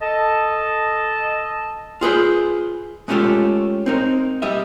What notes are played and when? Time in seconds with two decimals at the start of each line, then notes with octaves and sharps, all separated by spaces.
0.01 A4 D#5 A5
2.01 F4 G#4 B4 C5
3.08 G#3 A3 C#4 F4 G4 A4
3.86 C4 D#4 A#4
4.42 G3 D#5 E5